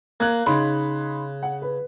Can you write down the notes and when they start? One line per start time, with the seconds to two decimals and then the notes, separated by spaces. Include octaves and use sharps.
0.20 A#3 F#6 G#6
0.46 C#3 D#4 B5 C6
1.43 F#5
1.62 B4